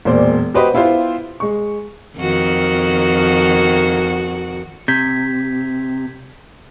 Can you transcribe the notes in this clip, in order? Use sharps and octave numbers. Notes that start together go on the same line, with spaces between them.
E1 A#2 C5 D5
F#4 G4 B4 C5 D#5
B3 E4 F4 G4 C5
G#3 C#6
F2 D#3 F#4
C3 G6 G#6 B6